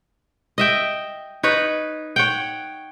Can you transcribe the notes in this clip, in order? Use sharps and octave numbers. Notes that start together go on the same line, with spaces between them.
D#5 E5 G5
D#4 B4 C#5
C#5 F#5 G5